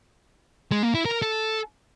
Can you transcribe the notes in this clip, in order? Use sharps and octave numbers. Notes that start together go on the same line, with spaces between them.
G#3
A#3
E4
A#4
A4